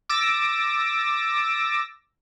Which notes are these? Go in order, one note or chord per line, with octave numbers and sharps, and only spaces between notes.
D6 E6 A6 A#6